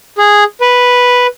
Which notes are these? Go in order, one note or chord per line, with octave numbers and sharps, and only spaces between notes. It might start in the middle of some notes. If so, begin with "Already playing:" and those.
G#4
B4